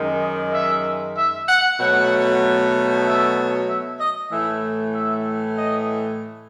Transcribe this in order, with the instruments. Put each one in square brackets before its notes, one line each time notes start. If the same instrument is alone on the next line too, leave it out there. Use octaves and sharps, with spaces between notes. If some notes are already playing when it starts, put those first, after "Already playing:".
Already playing: [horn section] F#2 D#3 G#3
D#5
E5
E5
F#5
B2 F#3 A3 F#5
E5
E5
D#5
A2 E3 A3 E5
E5
D#5